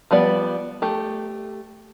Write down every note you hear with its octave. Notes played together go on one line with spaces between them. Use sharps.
F3 G3 B3 D5
A3 G4